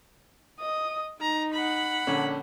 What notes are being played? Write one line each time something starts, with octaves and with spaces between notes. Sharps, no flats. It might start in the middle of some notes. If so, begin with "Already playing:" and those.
D#5 D#6
D#4 A#5
F#5 B5
A#1 D3 C#4